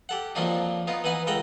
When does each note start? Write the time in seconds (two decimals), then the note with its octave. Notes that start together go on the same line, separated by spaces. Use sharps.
0.09 G4 A4 F#5
0.35 F2 F3 F#3 A#3 D4 D#4
0.87 B3 D#4 F4
1.04 E3 D#4 B4 F#5 G#5
1.27 C#2 A4 A#4 D#5 F#5 G5